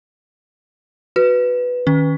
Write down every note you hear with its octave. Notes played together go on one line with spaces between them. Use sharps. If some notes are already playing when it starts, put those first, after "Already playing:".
F#4 B4
D#3 C#4